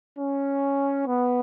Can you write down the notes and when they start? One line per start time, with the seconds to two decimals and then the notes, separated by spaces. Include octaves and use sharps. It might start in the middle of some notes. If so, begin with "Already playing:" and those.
0.18 C#4
1.07 B3